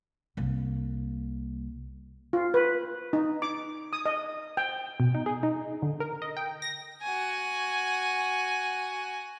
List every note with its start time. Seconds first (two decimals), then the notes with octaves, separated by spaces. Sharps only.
0.37 C2 A#3
2.33 F4
2.54 B4
3.13 D#4
3.42 D6
3.93 D#6
4.06 D#5
4.57 G5
5.00 B2
5.15 D#4
5.26 G#4
5.43 D#4
5.82 D3
6.00 A#4
6.22 D#5
6.37 G5
6.62 A#6
7.03 F#4 G#5